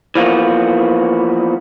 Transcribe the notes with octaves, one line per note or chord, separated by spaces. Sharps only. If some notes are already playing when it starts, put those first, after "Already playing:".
E3 F3 A#3 B3 F#4